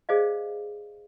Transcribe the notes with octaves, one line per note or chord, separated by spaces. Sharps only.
G#4 C5 D5 D#5 F5